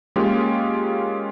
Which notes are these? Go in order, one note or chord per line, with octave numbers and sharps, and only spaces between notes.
G#3 A#3 C#4 F4 G4